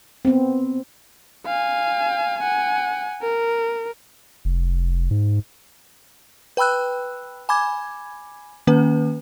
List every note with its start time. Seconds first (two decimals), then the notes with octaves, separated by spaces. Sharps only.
0.25 B3 C4
1.46 F5 G#5
2.39 F#5 G#5
3.21 A#4
4.45 F1
5.11 G#2
6.57 B4 G5 B5 E6 F#6
7.49 G#5 B5 D6 G#6
8.67 D#3 A#3 C#4 B4